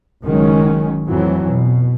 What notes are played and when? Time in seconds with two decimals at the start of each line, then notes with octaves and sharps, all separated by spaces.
0.24 F#1 D#3 F#3 G#3 C#4
1.07 F2 A2 E3 F#3
1.47 B2